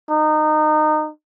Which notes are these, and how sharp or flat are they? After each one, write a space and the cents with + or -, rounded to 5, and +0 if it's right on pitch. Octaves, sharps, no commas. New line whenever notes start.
D#4 -25